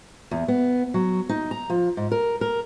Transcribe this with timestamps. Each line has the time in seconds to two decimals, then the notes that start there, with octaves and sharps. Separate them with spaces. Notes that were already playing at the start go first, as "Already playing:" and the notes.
0.31 E2
0.48 B3
0.94 F#3
1.29 D#4
1.51 A#5
1.70 F3
1.97 G#2
2.12 A#4
2.41 A#4